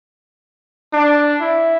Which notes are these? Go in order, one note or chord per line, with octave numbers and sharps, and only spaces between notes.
D4
E4